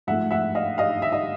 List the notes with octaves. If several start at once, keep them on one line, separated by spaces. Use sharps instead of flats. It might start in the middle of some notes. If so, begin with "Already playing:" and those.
G#2 F3 A3 E5 F#5
E5 F#5
D#5 F5
D#5 F5
E5
D#5